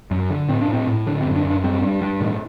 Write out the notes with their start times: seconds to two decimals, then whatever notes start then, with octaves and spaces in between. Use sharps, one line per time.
0.11 F#2
0.30 D3
0.49 A2 C4
0.61 D4
0.68 A2
0.73 C4
0.88 A2
1.07 D3 D4
1.21 C4
1.25 F#2
1.36 D4
1.45 F#2
1.50 D4
1.64 G2 C4
1.82 G2
2.02 G2
2.21 A2 D#3